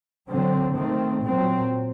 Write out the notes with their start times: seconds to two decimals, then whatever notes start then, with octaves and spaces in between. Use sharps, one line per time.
0.29 D3 F#3 C4
0.75 D#3 A3 C4
1.23 A#2 F#3 C4